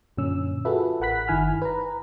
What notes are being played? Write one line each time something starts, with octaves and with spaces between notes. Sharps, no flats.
F#2 A#2 D3 C#4 E6
F4 F#4 G#4 A4 B4 E5
A1 A#4 F#5 B5 F#6 B6
G1 D#3 E4 G#5 F6
B4 A#5